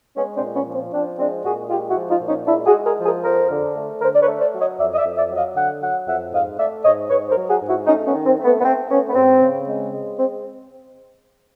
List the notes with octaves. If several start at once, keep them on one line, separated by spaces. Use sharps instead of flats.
G#3 B3 C#4
C4 D4
A#2
B3 C#4
F3
C4
F3 C4 D4
G#3 C4 D4
A#2 F#4 G#4
G#3 F4 G4
E4 F#4
F3
D#4 F4
A#2
C#4 D#4
G#3 D4 E4
F#4 G#4
G#3
G#4 A#4
F3
G#4 A#4
F2 A#4 C5
D3
A3
D3 A#4 C5
D5
B4 C#5
A3
C5 D5
F#3
C#5 D#5
F2 D5 E5
D#5
D5 E5
F2
D5 E5
F#3
D#5 F5
D3 F#5
F#3 F#5
F2 E5 F#5
G#2 D#5 F5
A3 D5 E5
G#2 C#5 D#5
G#2 B4 C#5
A#4 C5
F#3
F#4 G#4
G#2
E4 F#4
A3 C#4 D#4
B3 C#4
D#3
C4
A3
B3
B3
A3 C4
A3 B3 C#4
B3
G#2 C4
C#3
G#3
G#3
C4